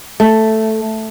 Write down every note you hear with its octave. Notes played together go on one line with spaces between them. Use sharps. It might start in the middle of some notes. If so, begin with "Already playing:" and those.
A3